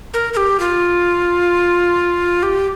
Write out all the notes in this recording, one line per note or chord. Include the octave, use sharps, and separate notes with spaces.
A#4
A#4
G4
F4
G4